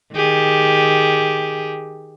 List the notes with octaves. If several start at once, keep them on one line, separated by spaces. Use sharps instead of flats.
D#3 G4 G#4